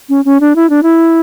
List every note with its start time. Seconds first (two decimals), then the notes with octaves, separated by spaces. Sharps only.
0.09 C#4
0.25 C#4
0.40 D4
0.56 E4
0.70 D4
0.83 E4